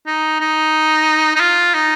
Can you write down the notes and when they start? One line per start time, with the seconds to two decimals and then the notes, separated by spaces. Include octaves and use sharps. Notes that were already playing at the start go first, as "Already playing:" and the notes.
0.06 D#4
0.40 D#4
1.36 D#4
1.40 F4
1.74 D#4